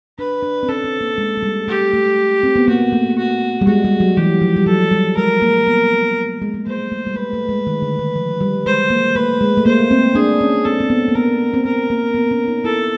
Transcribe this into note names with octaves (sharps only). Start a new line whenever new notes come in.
D4 B4
D4
C4
C#4 A4
C4
A#3
G#3
G#3
G3
A3 G4
A3
C4
B3
A#3 F#4
A3
F#4
G3
G#3 F#4
G3
F#3
E3 G4
F3
G3
F#3 A4
G3
G#3 A#4
A#3
B3
G#3
A3
A#3 C5
A3
G3
G#3 B4
A3
G#3
D#3
D3
D#3
F3
G3
G#3 C5
A#3
A3 B4
G#3
A3
A#3 C5
C4
D4 G#4
C#4
C4 A4
C4
B3
A#3
B3 A#4
C4
B3 A#4
A#3
B3
C#4
D#4
E4 A4